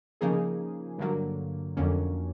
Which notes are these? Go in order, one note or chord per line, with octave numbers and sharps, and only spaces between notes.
C#3 F3 A#3 D#4 G#4
G2 D3 F#3 A#3
F2 D3 F#3 A#3 C#4